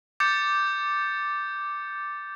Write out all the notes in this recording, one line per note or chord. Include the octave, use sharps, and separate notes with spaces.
D6 G6 A6 C#7